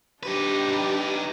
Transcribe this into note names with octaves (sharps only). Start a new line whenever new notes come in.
D4 D#4 G4 B4